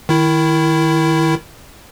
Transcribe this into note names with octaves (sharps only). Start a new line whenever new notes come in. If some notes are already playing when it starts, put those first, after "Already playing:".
D#3 E4